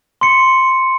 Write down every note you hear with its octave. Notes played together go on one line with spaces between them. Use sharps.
C6 C#7